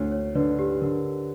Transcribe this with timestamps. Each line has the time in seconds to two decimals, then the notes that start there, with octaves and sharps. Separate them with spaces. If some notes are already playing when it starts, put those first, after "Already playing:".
Already playing: D2 C#5
0.12 C#5
0.35 D3 B4 D5
0.59 G4
0.81 D3 A#4